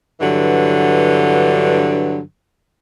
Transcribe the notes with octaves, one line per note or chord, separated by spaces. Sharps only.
G2 D3 E3 F#3